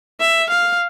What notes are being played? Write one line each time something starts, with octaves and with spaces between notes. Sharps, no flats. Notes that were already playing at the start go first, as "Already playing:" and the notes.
E5
F5